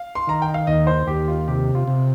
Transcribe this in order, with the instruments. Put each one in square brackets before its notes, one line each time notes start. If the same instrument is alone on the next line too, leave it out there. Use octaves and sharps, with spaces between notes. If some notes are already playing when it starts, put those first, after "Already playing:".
Already playing: [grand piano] F5
C6
[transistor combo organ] D#3 [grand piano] A#5
[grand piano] G5
F5
[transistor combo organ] D#2 [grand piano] D#5
[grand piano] C5
[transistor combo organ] D#2 [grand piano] G4
[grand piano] F4
[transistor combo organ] C3 [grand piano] G4
[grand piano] F4
[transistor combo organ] C3